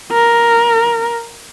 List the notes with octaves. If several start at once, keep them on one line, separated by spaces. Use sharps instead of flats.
A#4